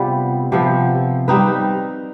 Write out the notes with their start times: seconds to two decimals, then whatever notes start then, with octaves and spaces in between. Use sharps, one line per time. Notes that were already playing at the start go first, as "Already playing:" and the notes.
Already playing: C3 G3 B3 F4
0.52 C3 F3 B3
1.28 G3 C4 D#4 B4